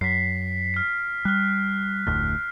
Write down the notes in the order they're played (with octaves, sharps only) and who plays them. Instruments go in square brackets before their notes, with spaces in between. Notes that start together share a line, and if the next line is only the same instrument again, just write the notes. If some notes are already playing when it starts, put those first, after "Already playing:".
[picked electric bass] F#2 [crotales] B6 C7
[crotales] F6 C7
[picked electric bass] G3 [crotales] F6 F#6
[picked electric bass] F1 D2 A2 [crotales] F6